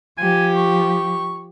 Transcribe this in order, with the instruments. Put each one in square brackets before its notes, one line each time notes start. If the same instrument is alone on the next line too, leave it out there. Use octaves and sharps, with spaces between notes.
[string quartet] F3 G4 [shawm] G#5
[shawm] C#6